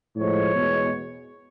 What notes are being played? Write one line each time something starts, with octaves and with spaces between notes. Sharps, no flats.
A2 F3 G#3 C#5
E2 B2 G#3 B3